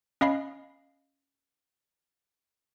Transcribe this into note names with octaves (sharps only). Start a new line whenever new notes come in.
C#4 D#5 F5 B5 C7